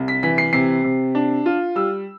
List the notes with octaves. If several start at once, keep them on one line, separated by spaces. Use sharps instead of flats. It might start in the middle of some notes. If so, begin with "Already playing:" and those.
Already playing: C2
B6
E3 B6
C7
C3 C7
C3
D4
F4
G3 E6